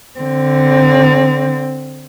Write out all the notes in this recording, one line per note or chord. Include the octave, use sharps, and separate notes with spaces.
D3 C4